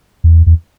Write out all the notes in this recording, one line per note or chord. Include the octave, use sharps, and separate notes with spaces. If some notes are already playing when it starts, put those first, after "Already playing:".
E2
E2